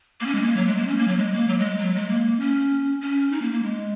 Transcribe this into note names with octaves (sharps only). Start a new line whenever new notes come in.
A#3
C#4
G#3
A#3
F#3
G#3
A#3
C#4
A#3
F#3
G#3
A#3
F#3
G#3
F#3
G#3
A#3
C#4
C#4
D#4
A#3
A#3
G#3